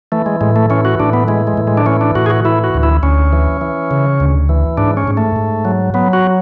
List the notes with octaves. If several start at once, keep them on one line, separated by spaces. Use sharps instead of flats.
E3 A3
G#3
A2 G#3
A3
E3 C#4
F#4
A2 D4
B3
E3 G#3
G#3
A2
G#3
D4
E3 C#4
D4
A2 F#4
G#4
F#4
E3 E4
F#4
D2
E4
D2 C#4
E3
E3
C#3
D2
E3
G#2 D4
C#4
G#2
A3
G#2
F#3
F#3 B3
F#4